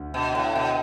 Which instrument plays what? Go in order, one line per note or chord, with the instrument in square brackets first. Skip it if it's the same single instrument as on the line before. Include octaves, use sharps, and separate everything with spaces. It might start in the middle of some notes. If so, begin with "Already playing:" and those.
Already playing: [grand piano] D2 D3
[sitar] B2
A2
B2